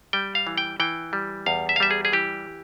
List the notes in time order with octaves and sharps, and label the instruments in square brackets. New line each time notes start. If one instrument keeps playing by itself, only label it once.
[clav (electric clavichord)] G3 G5
F5
E3
G5
E3 G5
G3
E2 F5
E5
F5
G3 E5
G#4
G#4
E3 G4